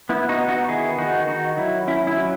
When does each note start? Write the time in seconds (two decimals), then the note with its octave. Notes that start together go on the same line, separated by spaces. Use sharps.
0.09 B3 E4
0.29 D#4 F#4
0.39 B3
0.48 D#4 F#4
0.68 D#3 E4 G#4
0.98 D#3 D#4 F#4
1.28 D#3 D#4 F#4
1.57 F#3 E4
1.88 C#4 E4
2.07 E4
2.17 F#3